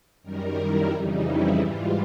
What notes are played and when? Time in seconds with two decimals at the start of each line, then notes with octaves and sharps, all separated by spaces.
0.22 F#2 D#3 G3 A#4
0.56 E4
0.90 F2 C#3 E3 G3 D#4
1.24 E4
1.58 G#2 E3 G3 F4